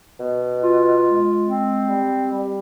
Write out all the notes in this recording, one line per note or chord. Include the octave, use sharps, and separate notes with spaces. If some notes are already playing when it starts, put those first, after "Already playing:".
B2
F4
G#3
C4
G3
G3